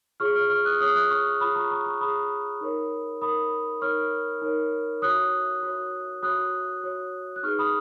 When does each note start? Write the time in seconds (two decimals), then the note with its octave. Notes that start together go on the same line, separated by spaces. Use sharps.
0.20 F4 G#4 C#5 C#6 F6
0.35 C#6 F6
0.50 C#6 F6
0.65 D#6 F#6
0.80 F4 G#4 C#5 D#6 F#6
0.95 D#6 F#6
1.11 C#6 F6
1.40 F4 G#4 C#5 B5 D#6
1.56 A#5 C#6
1.71 A#5 C#6
1.86 A#5 C#6
2.01 F4 G#4 C#5 B5 D#6
2.61 D#4 A#4 C#5
3.21 D#4 A#4 C#5 B5 D#6
3.81 D#4 A#4 C#5 C#6 F6
4.42 D#4 A#4 C#5
5.02 F#4 C#5 D#6 F#6
5.63 F#4 C#5
6.23 F#4 C#5 D#6 F#6
6.83 F#4 C#5
7.36 F#6
7.43 D#4 G#4 B4 C#6 F6
7.59 B5 D#6